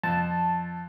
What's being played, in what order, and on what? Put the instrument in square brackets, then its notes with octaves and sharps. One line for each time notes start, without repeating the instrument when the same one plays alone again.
[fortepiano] F2 [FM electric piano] A5